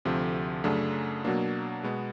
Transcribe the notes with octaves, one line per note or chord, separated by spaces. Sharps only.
D2 C3 F3 A3
F#2 C#3 F#3 A3 D4
B2 F#3 A#3 D4
B2 G#3 B3